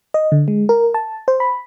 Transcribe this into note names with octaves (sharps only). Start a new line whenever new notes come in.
D#5
D3
G#3
A#4
A5
C5
B5